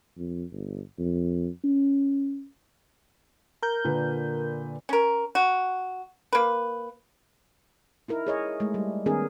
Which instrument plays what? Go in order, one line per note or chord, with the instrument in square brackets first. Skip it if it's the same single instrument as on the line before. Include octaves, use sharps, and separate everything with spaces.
[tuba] F2
G1
F2
C#4
[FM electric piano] A#4 G6
[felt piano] A#2 D3 B4
[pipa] C#4 A#4
F#4
A#3 B4
[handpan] D#4 E4 A#4
G#4 C#5 D#5
G#3 A3
G3
D#3 B3 C#4 D#4 G#4 A#4